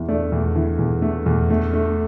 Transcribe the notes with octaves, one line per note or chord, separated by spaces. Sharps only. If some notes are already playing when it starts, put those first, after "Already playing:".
Already playing: E2 E3
A3 D5
E2
E3
E2
A3
E2
A3
A3